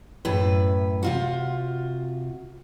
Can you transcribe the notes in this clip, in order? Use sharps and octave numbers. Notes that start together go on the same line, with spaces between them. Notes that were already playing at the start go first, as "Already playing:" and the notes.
F#2 A2 B4
C3 F4 F#4